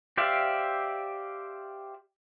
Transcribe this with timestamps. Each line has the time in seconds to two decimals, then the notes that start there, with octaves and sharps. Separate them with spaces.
0.17 G4 C5 D5 E5 F5